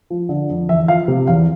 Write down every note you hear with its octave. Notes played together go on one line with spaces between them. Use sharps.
F3
D3
F2
E2 E5
F3 F5
C3
E2 F5